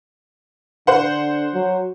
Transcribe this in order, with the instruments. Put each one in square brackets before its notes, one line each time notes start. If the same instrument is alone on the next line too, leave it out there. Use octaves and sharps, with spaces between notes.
[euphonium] D3 [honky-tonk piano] C5 F#5
[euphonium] F#3